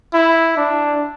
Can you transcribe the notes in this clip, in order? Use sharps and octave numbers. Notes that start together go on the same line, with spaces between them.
E4
D4